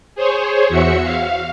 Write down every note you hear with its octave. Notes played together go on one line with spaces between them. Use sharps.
G#4 C5 C#5
E2 F#4 E5 C#7
F5